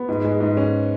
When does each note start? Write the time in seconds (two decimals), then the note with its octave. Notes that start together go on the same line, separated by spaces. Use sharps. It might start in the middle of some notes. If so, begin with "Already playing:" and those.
Already playing: B3
0.08 G#2
0.24 G#3
0.40 G#2
0.57 C#4